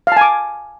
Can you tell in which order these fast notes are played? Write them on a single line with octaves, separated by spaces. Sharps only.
F5 A5 G#5 D6